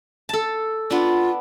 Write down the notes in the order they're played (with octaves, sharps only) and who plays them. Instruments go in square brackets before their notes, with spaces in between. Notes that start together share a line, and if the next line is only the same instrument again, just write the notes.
[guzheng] A4 A5
[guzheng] B3 D4 [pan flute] F4